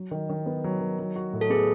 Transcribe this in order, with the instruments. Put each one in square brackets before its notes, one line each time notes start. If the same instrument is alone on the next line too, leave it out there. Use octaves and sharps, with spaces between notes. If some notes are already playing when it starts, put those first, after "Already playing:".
Already playing: [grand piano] F#3
D#3
D#3
B3
F#3
D#3
F#3
F#4
A2
[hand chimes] A4
[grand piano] B3 [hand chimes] G#4